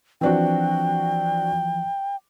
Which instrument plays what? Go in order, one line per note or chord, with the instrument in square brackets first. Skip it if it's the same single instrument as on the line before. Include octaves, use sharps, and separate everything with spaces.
[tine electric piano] E3 F3 [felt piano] C4 D4 F#4 [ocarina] G5